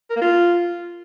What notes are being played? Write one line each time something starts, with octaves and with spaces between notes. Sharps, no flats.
A#4
A#3
F4